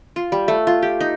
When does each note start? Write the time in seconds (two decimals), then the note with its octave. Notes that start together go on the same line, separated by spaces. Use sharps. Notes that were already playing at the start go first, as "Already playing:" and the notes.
0.16 F4
0.32 G3
0.48 A3
0.67 F4
0.83 G4
1.01 D#4